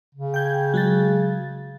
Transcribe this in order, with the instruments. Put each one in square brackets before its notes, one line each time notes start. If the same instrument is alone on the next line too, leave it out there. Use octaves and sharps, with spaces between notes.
[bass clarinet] C#3
[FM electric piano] G5 G6 G#6
F#3 G#3 A6